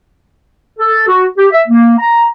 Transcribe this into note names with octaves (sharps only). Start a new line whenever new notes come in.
A4
F#4
G4
E5
A#3
A#5